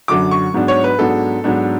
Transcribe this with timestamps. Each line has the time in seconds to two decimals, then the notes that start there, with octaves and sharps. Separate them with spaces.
0.08 F#2 D3 F#3 D6
0.31 C#6
0.54 G#2 F#3 B3 D4
0.68 C#5
0.84 B4
0.99 G#2 F#3 B3 D4 A4
1.44 G#2 F#3 B3 D4